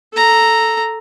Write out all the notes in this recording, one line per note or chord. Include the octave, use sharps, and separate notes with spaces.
A4 A#5